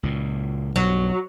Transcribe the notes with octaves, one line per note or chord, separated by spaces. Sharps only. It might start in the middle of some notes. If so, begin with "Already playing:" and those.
C#2 A#2
B1 G2 F#3